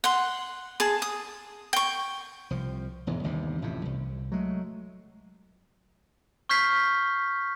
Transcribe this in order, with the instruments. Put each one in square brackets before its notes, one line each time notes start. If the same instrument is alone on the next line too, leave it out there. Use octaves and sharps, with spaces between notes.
[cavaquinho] F#5 C6
G#4 A5
D#6
G5 C#6
[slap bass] C2 F3
E1 E2 G#2
G1 D#2 C3
A1 F2 A2 C3
C2
F#3 G#3 A3
[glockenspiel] C#6 F6 G6 G#6 B6 C7